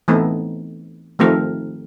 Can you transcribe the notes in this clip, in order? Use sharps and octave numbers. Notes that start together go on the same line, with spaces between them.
E3 A3 B3 C4 D#4
D#3 F3 A3 C4 A#4